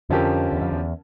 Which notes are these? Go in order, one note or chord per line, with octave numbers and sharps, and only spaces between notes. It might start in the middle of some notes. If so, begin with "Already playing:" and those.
F2 D3 F3 C#4 G4 A#4
E2
F2
E2